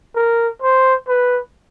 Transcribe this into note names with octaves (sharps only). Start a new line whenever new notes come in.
A#4
C5
B4